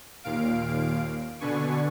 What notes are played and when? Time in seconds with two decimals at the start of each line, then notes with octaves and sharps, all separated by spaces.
0.23 D#2 A#2 F5 D7
1.40 B2 D3 D4 B4 G#5 C#6